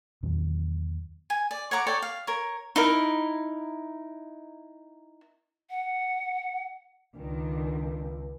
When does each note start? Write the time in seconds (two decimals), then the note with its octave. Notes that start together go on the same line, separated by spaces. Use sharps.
0.23 E2 A#2 D#3 F#3
1.30 G#5
1.51 D5
1.71 C#5 F#5 A#5 D6
1.86 A4 C#5 D5 G5
2.02 F5
2.27 A#4 C#5
2.76 D#4 E4 A#4
5.70 F#5
7.17 C#2 D#3 D4